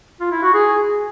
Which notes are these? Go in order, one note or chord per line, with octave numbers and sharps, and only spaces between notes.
F4
E4
F#4
G#4